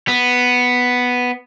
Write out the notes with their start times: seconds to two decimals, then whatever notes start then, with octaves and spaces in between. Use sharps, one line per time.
0.08 B3